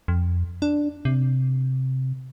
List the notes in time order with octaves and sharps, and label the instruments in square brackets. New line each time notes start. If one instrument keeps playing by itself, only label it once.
[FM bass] F2
D4
C3